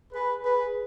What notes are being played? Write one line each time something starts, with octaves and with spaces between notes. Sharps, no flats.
G#4 B4
G#4 B4